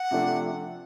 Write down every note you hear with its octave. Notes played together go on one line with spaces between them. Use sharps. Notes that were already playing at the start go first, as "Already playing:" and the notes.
Already playing: F#5
C3 F3 A3 D4